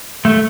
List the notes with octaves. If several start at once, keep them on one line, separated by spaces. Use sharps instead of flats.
A3